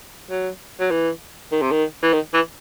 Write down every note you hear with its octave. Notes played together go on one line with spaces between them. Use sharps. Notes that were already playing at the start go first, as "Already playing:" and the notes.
F#3
F#3
E3
D#3
C3
D#3
E3
D#3
E3